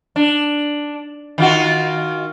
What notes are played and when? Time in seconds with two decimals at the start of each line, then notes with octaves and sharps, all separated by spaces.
0.16 D4
1.38 D#3 F4 F#4